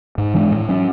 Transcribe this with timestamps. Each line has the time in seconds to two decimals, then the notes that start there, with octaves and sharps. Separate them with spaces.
0.18 G#2
0.34 E3 G#3 D4
0.52 A2
0.69 F#3 C#4